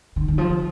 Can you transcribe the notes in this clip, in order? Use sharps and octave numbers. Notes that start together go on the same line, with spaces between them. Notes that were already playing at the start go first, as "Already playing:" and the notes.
D#3
D#3
F3